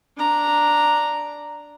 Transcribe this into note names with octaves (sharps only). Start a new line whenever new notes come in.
D4 A#5